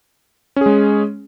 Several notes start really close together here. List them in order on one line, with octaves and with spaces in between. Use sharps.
C#4 G#4 G#3